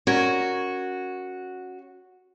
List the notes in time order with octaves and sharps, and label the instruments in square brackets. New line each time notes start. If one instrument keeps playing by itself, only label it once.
[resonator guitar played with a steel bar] C#4 A#4 C#5 [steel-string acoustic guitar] F#4